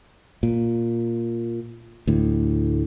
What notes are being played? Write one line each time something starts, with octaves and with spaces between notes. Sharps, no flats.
A#2
D2 A2